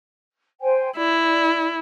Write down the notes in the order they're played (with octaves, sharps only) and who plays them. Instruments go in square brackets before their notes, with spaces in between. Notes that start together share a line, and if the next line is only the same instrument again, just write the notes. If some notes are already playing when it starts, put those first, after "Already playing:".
[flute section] C5 G5 G#5
[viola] E4 [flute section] D5